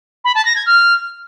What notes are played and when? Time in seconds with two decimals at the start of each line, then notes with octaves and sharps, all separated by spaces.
0.25 B5
0.35 A5
0.45 A#6
0.56 G#6
0.66 F6